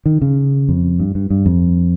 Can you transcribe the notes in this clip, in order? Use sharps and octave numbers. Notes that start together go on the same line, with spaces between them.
D#3
C#3
F2
G2
G2
G2
F2